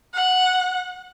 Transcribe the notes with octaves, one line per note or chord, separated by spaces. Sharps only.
F#5